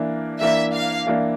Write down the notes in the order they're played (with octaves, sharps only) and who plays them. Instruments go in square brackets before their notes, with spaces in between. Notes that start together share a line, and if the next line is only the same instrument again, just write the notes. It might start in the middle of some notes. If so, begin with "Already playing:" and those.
Already playing: [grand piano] E3 A#3 D4
[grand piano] E3 A#3 D4 [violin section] E5
[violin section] F5
[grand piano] E3 A#3 D4